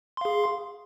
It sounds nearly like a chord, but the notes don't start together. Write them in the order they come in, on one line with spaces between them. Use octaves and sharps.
C6 F5 G#4